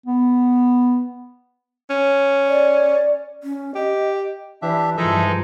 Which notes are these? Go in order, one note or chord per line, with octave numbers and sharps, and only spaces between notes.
B3
C#4
D5
C#4
G4 D#5
E3 D4 G4 E5
G2 F3 G#3 D#4 A4 E5